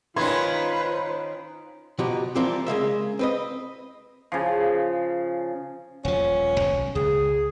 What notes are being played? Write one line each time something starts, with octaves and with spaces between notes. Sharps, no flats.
D#3 C#4 F4 B4 C5 C6 G#6
B2 F3 D#4 F#4 G4
E3 F3 G3 A#3 C4 G4
C#3 G#3 A#3 E5
C4 B4 D#5
C#3 F3
D#1 F3 C#4
B1
C#2 G#4